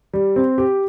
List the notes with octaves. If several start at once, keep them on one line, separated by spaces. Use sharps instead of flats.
G3
C4
G4